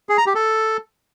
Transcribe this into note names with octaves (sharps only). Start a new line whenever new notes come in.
G#4
A#5
G4
A4